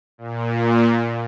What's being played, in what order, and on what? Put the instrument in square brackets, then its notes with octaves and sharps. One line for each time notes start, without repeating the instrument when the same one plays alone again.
[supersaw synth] A#2